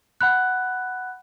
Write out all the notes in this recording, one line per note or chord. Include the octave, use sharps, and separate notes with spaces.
F#5 B5 F#6